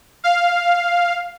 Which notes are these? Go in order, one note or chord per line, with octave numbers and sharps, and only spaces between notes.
F5